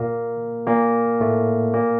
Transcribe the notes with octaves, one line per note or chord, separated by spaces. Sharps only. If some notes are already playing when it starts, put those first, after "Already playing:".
Already playing: A#2 A#3
A#2 A#3
A2 A3
A#2 A#3